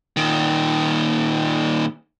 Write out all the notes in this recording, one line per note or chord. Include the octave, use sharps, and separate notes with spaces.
A#2 D#3